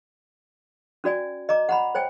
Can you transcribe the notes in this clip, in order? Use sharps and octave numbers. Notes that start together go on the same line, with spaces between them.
C#4 F#4 D5 G#5
D#5 A#5 D6
F#5 A#5 B5
C5 C#5 G5 G#5